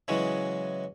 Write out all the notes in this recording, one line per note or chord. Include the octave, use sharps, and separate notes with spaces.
C#3 E3 F#3 G#3